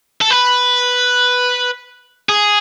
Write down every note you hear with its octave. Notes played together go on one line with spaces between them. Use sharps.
A4
B4
G#4